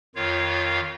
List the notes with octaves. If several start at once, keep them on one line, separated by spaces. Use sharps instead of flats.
F2 D#3 F4 C#5 F5